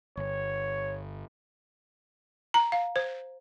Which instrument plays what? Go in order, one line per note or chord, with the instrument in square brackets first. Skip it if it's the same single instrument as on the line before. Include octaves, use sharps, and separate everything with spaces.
[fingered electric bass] G1 [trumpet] C#5
[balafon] A#5
F5
C5